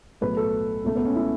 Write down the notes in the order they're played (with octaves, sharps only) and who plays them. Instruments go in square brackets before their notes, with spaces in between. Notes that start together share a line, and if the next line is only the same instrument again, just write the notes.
[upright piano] B1 A2 F#3 A3 B4
A4
C#2 B2 A3
B3
C#4
E4